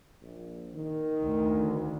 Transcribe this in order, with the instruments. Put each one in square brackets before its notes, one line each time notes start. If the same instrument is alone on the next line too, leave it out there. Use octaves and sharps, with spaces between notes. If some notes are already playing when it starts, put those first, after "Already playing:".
[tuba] A#1
D#3
[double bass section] D2